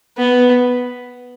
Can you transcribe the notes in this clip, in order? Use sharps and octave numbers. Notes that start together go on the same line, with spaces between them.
B3